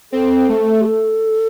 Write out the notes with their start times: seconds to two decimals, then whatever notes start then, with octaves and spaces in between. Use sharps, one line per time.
0.12 C4 A4
0.49 A3
0.81 G4
0.86 A4